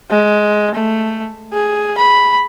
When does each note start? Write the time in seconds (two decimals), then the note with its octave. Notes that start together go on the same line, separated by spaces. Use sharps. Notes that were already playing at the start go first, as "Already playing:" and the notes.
0.10 G#3
0.75 A3
1.53 G#4
1.98 B5